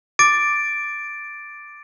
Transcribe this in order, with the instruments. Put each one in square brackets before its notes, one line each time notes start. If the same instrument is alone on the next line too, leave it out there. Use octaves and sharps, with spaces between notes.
[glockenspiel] D6 A6 D7